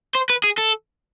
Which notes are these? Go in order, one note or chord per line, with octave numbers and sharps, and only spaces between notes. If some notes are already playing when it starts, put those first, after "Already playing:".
C5
B4
G#4
A4